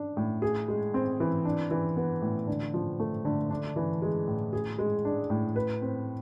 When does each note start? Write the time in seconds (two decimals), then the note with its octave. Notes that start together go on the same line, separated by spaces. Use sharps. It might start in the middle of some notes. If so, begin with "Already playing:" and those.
Already playing: D4
0.17 A2
0.42 G#4
0.68 G#3
0.94 C4
1.20 E3
1.45 D4
1.71 E3
1.97 B3
2.22 A2
2.47 D3
2.74 F3
3.00 A3
3.25 D3
3.51 D4
3.76 E3
4.02 G#3
4.28 A2
4.53 G#4
4.79 G#3
5.05 D4
5.30 A2
5.56 B4
5.82 C4